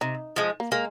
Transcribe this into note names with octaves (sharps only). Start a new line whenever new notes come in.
C3 D#4
F3 G#3
A#3
G#3 A#3